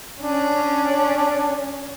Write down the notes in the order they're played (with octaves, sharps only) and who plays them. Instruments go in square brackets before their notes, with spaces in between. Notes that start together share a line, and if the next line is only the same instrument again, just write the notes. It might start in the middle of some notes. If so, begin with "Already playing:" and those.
[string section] C#4 [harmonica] D4